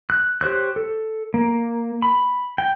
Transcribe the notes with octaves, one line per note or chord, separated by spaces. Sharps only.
F#6
G4 C5 C#5 F#6
A4
A#3
B5
G5